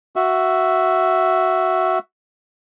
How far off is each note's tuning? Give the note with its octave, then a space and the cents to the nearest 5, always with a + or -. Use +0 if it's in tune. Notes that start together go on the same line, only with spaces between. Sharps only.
F#4 +0 E5 +5